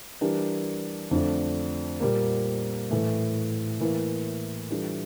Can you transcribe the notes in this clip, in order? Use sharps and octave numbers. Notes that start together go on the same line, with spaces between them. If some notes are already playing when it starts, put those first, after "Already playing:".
E3 G3 D4 G4 A#4
F2 D3 A3 D4
A#2 G3 A#3
A2 E3 A3
A2 E3 A#3 E4
E3 G3 D4 F4 A4